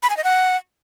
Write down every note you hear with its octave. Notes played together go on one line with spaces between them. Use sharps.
B5
G#5
D#5
F#5